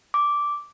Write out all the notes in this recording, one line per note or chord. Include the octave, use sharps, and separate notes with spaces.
D6